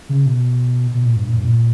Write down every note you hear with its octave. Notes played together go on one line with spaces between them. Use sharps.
C#3
B2
B2
A#2
G2
A#2
G2
A#2